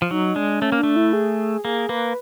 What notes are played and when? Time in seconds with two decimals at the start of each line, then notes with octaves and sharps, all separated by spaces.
0.02 F3
0.11 F#3 D#4
0.36 G#3 D4
0.61 A3 C#4
0.72 A#3
0.79 A3 D4
0.96 E4
1.13 G#4
1.64 A#3 G#4
1.89 A#3 B4